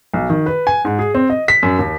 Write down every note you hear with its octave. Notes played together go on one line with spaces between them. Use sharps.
B1
D#3
B4
G#5
G#2
G#4
C4
D#5
B6
F#2
D#2